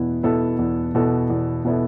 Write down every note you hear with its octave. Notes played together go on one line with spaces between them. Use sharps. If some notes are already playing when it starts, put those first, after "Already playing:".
Already playing: E2 B2 B3 E4
B2 B3 E4 A4
E2
B2 B3 E4 A4
E2
B2 B3 E4 A4